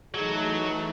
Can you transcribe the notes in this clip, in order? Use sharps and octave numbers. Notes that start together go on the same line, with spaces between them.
E3 F#3 A3 D#4 G#4